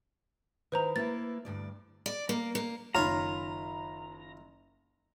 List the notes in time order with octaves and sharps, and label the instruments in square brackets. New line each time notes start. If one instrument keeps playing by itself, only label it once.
[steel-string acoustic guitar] D#3 E4 [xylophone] B4 C5 A#5
[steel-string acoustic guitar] A#3 E4 B4 [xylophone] A6
[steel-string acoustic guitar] D2 G2 D5
D5
A#3
A#3
[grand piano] F#1 D#3 B5 [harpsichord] F4 C#5 [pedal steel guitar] A#5